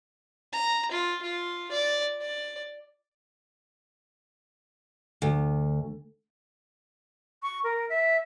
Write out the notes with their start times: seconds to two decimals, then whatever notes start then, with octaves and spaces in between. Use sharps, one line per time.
0.52 A#5
0.91 F4
1.22 F4
1.71 D5
2.21 D5
5.22 D2
7.42 C#6
7.64 A#4
7.89 E5